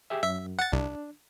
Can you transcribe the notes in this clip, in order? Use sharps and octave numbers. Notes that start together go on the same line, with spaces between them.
G4 G#4 E5
F#2 E5
F#5 A6
C2 D4